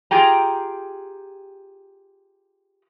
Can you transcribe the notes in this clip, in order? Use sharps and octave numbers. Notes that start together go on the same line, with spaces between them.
F4 G4 G#4 G5 A#5